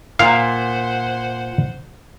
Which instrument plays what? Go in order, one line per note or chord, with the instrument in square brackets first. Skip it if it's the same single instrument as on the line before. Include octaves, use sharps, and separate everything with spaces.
[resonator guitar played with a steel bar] A#2 [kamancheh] C5 F#5 [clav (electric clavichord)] F5